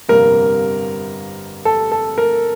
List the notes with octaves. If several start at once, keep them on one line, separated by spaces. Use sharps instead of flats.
G1 F2 C3 G3 A#3 A#4
A4
A4
A#4